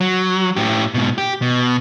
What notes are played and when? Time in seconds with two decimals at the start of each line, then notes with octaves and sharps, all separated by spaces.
0.01 F#3
0.56 A2 G4
0.94 G#2 B2
1.18 G4
1.42 B2